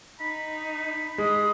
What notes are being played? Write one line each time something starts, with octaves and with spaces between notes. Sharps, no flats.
D#4 B5
G#3 D#6